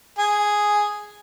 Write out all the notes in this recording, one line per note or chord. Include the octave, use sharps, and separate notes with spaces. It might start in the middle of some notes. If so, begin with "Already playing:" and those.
G#4